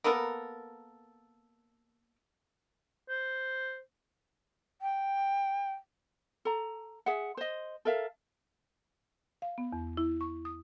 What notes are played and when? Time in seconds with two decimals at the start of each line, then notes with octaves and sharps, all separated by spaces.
0.04 A#3 B3 A4 A#4
3.09 C5
4.82 G5
6.45 A4 A#5
7.06 G#4 E5 F#5
7.37 C5 D#5
7.85 A4 A#4 E5 F5
9.42 F5
9.58 B3
9.73 E2
9.97 E4
10.21 C#6
10.45 D#6